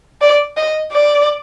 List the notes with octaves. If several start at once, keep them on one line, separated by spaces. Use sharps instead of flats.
D5
D#5
D5